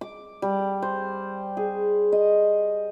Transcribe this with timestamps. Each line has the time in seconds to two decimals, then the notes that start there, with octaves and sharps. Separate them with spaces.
0.01 D6
0.42 G3
0.82 C5
1.57 G#4
2.12 D#5